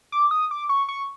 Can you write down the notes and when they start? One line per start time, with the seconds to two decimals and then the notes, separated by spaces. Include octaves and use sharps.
0.12 D6
0.31 D#6
0.51 D6
0.69 C#6
0.89 C#6